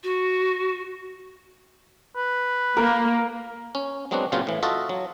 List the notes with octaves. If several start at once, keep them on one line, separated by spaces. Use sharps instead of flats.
F#4
B4
A#3 A#4
C#4
F#3 G#3 B3 C4 D4 F#4
A#2 C#3 F#3 C4 C#4 F4
A2 E3
F4 F#4 A4 D#5 E5
F#3